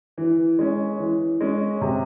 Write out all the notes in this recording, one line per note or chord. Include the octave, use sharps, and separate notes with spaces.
E3
G#3 C#4
E3
G#3 C#4
C3